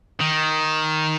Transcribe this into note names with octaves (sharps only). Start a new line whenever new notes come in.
D#3